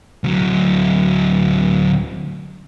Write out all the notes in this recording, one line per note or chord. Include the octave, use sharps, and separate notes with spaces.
D2 F#3